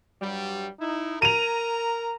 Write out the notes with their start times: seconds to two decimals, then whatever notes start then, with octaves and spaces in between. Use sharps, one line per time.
0.21 G2 F#3 G3
0.80 D#4 E4
1.22 A#4 A#5 D#7 F7